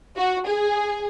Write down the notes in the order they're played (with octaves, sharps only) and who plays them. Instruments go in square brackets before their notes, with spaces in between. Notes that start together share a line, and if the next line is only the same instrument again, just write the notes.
[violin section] F#4
G#4